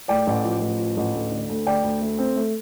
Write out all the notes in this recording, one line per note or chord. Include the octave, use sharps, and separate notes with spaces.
A2 D5 G5
A1
F3
A1
F3
A1
D2
D3
D2
D2 D5 G5
D2
A3
C4
A3